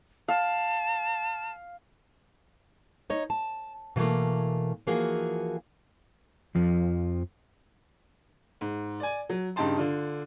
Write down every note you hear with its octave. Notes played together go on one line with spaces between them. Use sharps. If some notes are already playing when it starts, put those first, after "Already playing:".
F5 A5
D#4 C#5 D#5
A5
B2 E3 F#3 A3 A#3
E3 F3 A#3 F#4 G#4
F2 F3
G#2
D5 G#5
F#3
G2 C#3 D#4 G4 A5 C6
D3 D4 F4